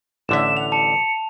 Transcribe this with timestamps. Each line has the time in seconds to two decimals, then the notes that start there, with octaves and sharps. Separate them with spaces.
0.29 A1 D3 E5 E7
0.57 F#5 F7
0.72 A5 C#7